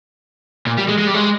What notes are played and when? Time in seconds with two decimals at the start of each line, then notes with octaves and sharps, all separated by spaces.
0.67 A#2
0.78 G3
0.88 G#3
0.99 G#3
1.07 G3
1.14 G#3